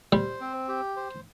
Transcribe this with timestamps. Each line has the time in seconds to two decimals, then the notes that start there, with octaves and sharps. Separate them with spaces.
0.12 G3 C5
0.41 C4
0.68 G4
0.96 C5